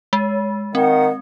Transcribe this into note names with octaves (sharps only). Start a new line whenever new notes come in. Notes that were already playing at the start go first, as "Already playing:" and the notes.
G#3
D#3 C4 F#5